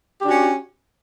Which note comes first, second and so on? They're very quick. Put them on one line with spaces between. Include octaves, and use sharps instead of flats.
G4 D4 F#4 C#4